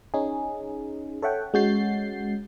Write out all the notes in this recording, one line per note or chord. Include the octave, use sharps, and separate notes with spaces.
C#4 D#4 G#4
A4 C#5 E5 F#5 G5
G#3 C#4 F#4 G6 A6 C7